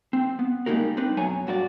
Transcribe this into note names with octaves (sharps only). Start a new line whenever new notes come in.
C4
B3
G3 G#3 A#3 D#4 F#4 A#4
C4 D4 D#4 B4
F#2 B2 A3 C#5 G#5 A#5
G2 F#4 A#4 D5